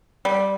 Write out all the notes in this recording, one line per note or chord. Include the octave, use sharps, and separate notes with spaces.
G3